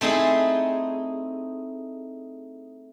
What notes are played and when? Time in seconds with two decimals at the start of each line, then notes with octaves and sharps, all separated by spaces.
0.01 A3 C4 D#4 E4 G#4